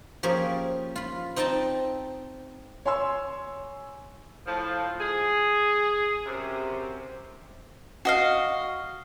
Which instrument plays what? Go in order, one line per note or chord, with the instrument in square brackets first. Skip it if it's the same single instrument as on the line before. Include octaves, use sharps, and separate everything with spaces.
[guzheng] F3 A#3 C#4 G4 G#4
F4 B5
C4 D#4 D#5 G5 A5
[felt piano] C#5 G#5 C6 E6
[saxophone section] A2 F3
G#4
F#2 C3
[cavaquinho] F#4 D#5 F5